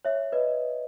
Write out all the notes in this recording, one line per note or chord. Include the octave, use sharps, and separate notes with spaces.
C#5 E5
B4 D#5